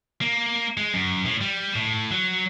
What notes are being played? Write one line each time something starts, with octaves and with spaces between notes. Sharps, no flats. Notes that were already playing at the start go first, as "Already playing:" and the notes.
A#3
G#3
F#2
A2
G3
A2
F#3